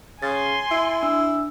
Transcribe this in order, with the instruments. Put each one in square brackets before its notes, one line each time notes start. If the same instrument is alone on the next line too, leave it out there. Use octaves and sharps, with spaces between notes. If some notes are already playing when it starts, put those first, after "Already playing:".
[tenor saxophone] C#3 [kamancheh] G#5 C6 [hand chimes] A6
[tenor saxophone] E4
[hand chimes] D4 E6